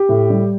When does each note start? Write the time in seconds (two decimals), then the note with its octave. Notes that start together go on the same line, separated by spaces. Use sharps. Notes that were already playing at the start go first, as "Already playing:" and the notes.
Already playing: G4
0.09 A2
0.30 G3